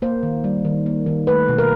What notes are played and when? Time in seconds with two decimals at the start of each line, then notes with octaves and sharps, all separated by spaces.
0.02 A#3 C5
0.23 D#3
0.44 G3
0.65 D#3
0.86 A#3
1.06 D#3
1.27 A3 B4
1.48 B2
1.58 A#4